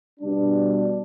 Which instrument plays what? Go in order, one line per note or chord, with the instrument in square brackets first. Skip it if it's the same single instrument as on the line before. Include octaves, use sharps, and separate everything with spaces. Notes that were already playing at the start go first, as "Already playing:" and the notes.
[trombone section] B2 G3 D4